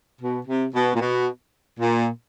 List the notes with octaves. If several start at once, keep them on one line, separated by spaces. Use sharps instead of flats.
B2
C3
B2
A#2
B2
A#2